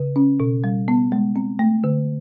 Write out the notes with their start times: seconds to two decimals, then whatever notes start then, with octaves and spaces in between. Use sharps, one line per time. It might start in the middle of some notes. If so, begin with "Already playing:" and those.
Already playing: C#3
0.16 C#4
0.40 B2
0.64 G3
0.88 B3
1.12 G#3
1.36 C4
1.59 A3
1.84 D3